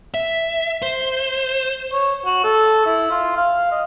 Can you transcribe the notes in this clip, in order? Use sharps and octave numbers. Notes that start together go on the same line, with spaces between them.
E5
C5
C#5
F#4
A4
E4
F4
F5
D#5